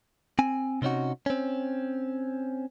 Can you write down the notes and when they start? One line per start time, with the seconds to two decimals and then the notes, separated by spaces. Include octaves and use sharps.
0.39 C4 G#5
0.82 C3 C4 C#4 D#4 F#4
1.26 C4 C#4